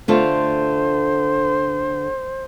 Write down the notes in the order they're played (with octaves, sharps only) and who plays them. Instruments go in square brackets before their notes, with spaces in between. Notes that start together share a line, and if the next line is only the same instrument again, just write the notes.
[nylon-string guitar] D3 A3 F4 [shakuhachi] C5